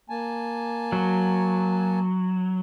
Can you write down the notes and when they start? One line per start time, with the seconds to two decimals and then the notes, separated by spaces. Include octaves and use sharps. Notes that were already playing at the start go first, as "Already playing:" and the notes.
0.10 A#3 G#5 A5
0.92 F#3